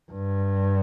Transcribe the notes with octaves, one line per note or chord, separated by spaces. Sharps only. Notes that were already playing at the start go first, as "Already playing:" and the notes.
G2